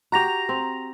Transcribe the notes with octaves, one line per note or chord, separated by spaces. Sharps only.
F#4 G4 A#5 A#6 F7
C4